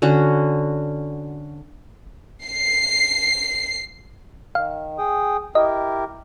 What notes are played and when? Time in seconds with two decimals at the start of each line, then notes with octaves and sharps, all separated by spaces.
0.02 D3 C#4 F#4
2.45 C7
4.55 D#3 F5
4.98 G#4 G5 D#6
5.55 E4 G4 A#4 D#5